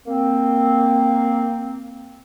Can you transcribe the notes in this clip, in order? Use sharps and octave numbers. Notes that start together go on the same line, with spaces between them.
A#3 C4